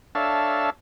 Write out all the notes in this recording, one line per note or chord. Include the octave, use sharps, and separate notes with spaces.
D4 A4 C#5 E5 F5 A5